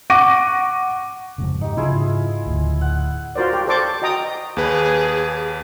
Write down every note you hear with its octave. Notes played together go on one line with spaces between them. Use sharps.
F#5 C#6 D6 A#6 D#7
F2 G#2 C#3
D#4 G4
G#2 C#3 D4 E4 F4 G#4
D1 D2
F#5
F4 F#4 A#4 C5 D5
G4
A4 C5 D5 C#6 D6
F#4 D#5 G5 A#5 D#6
D#2 G#4 B4